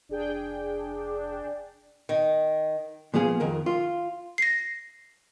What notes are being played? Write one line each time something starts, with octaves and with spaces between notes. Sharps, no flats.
F1 D4 G#4 G5
D#3
A#2 F3 B3 G#4 F5
F2 D#3 A#4
F4
A#6 C7